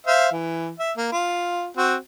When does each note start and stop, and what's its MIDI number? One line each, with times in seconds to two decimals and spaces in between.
0.07 0.29 72
0.07 0.29 76
0.07 0.29 77
0.32 0.70 52
0.79 0.92 76
0.97 1.08 58
1.12 1.66 65
1.77 1.95 60
1.77 1.95 66